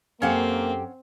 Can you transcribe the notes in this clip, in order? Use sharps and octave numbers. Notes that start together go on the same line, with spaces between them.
F#2 A#3 C4 C#4 G4 A4 F5 F#5